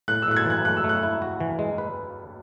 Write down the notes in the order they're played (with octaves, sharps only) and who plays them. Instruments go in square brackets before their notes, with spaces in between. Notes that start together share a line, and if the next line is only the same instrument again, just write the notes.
[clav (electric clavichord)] A2 [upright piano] F#6
[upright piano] E6
[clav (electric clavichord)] A2 [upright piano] F#6
[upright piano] G#6
[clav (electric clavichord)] E3 [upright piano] F#6
[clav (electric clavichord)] A3 [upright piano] F#6
[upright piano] E6
[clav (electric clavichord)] A3
[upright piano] F#6
[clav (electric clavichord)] E4
F#4
E3
G#3
B4